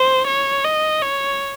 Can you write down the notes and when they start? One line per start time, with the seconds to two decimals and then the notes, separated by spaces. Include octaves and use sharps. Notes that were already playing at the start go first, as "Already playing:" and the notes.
Already playing: C5
0.27 C#5
0.65 D#5
1.02 C#5